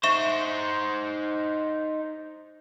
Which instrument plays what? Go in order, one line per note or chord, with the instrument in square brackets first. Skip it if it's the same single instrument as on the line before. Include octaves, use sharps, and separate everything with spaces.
[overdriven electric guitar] D#4 C5 [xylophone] E5 C#6 E7